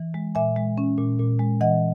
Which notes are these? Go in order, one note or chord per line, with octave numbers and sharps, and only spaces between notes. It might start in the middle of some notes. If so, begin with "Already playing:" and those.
Already playing: E3
G#3
A#2 E5 G#5
G#3
C#4
A#2
A#2
G#3
E3 D#5 F#5